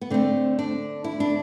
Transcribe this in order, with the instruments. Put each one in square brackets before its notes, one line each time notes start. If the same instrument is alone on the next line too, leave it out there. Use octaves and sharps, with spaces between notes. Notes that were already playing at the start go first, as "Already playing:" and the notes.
[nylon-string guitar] B3
D3 A3 C4
D4
E4
D4